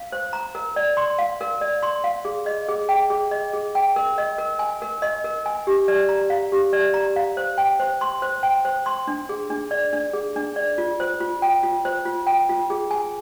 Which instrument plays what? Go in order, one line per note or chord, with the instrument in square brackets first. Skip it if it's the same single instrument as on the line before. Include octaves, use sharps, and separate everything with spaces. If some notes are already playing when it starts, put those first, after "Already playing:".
Already playing: [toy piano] F5
C5
A#5
A#4
D5
C6
F5
A#4
D5
C6
F5
G#4
D#5
G#4
G5
G#4
D#5
G#4
G5
A#4
D#5
A#4
G#5
A#4
D#5
A#4
G#5
G4
D5
A#5
F5
G4
D5
A#5
F5
C5
G5
C5
C6
C5
G5
C5
C6
D4
G#4
D4
D5
D4
G#4
D4
D5
F4
C5
F4
G5
F4
C5
F4
G5
F4
G#4
G#5